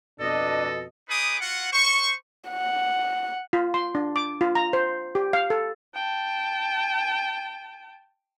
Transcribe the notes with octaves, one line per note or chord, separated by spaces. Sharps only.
F2 B2 D4 A4 D#5
D#4 G#4 B4 D6 D#6
F4 F#4 F#5
C5 C#6
F#5
F4
C6
D4
D6
F4
A#5
C5
G4
F5
A4
G5 A5